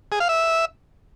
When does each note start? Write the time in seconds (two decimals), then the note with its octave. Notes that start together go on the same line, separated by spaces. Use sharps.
0.12 G#4
0.20 F5
0.29 E5